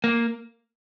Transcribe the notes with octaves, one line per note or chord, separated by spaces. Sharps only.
A#3